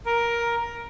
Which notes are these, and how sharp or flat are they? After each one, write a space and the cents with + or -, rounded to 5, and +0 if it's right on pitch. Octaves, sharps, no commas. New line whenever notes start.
A#4 +10